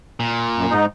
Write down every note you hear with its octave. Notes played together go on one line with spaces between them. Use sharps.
A#2
F#2
G#2 D#4